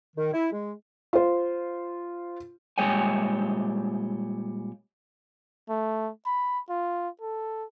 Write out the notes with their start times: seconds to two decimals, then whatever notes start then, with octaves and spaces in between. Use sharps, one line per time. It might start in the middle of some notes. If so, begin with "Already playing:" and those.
0.16 D#3
0.33 E4
0.52 G#3
1.13 F4 C5
2.78 A#2 G3 G#3 C#5 G5 G#5
5.69 A3
6.26 B5
6.69 F4
7.21 A4